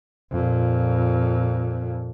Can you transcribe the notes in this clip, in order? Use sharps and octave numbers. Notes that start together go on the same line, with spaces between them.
F2 A#2